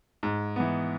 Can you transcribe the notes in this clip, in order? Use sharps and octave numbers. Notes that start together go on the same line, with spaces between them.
G#2
E3 B3